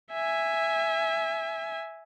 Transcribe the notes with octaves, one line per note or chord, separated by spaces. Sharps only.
E5 G#5